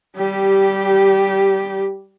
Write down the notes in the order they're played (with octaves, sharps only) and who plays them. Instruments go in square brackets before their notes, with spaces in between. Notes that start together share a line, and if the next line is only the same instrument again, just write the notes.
[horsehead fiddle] G3 G4